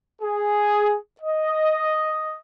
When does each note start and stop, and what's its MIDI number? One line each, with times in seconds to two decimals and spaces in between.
0.22 0.96 68
1.21 2.38 75